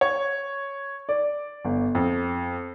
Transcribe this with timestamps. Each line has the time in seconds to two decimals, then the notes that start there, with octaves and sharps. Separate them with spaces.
0.01 C#5
1.09 D5
1.65 G1
1.95 F2